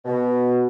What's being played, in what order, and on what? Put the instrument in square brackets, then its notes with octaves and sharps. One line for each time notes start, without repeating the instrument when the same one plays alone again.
[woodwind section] B2